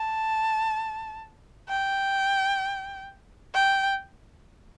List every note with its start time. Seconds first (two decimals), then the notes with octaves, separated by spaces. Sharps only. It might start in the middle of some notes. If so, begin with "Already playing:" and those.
Already playing: A5
1.69 G5
3.55 G5